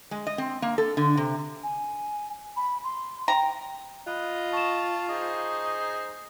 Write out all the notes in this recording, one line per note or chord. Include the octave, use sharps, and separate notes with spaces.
G#3
D#5
C4
A#3
A4
D3
C3
G#5
B5
C6
G5 A#5
F4 D#5 B5 F#6
A5 C#6 E7
D#4 G#4 C5 D#5